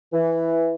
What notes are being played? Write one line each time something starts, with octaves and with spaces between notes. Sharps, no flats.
E3